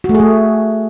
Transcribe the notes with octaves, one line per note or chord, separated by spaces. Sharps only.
F#4
A3
G#4
A3